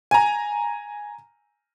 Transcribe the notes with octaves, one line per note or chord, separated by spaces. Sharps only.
G#5 A#5